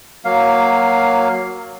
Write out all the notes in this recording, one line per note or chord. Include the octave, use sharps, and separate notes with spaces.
F#3 A#3 F5